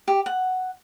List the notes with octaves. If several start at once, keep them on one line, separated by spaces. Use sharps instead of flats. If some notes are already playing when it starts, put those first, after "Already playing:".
G4
F#5